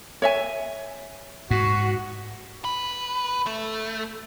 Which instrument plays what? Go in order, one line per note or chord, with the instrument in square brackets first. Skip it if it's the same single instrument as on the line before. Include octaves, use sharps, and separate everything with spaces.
[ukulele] C#5 E5 G#5
[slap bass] G#2 [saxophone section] F#4
[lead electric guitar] B4
A3